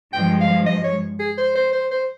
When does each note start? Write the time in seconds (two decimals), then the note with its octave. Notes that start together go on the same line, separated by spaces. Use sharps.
0.13 G2 F3 G#3 G5
0.41 F5
0.66 D#5
0.84 C#5
1.20 G#4
1.38 C5
1.56 C5
1.73 C5
1.91 C5